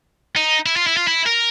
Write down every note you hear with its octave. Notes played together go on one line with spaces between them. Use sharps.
D#4
E4
F4
E4
F4
E4
A#4